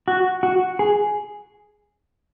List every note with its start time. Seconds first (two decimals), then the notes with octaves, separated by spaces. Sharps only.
0.08 F#4
0.43 F#4
0.79 G#4